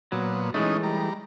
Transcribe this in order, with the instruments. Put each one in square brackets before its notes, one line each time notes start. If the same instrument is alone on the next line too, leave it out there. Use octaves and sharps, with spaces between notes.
[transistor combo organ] A#2 B3 [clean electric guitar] F#3
[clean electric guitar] E3 G#3 A3 [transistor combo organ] C#4 D#4
[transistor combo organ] G3 A#5